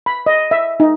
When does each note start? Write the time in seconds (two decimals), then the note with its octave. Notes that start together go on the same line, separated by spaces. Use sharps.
0.06 B5
0.26 D#5
0.51 E5
0.80 D#4